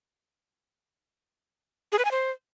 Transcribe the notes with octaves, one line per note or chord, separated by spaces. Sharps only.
G#4
B4
G#5
C5